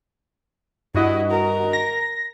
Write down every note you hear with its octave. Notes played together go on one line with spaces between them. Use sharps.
G2 E4 F#4 D#5
A#4
A#6